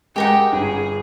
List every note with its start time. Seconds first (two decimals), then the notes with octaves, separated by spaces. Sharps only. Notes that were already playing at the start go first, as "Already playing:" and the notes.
0.16 G#3 G4 A#4 F#5 G5
0.52 G1 G#4